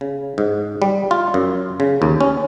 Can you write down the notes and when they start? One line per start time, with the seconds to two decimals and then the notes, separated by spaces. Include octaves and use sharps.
0.01 C#3
0.38 G#2
0.82 G3
1.11 F4
1.34 F#2
1.80 C#3
2.02 D#2
2.21 C#4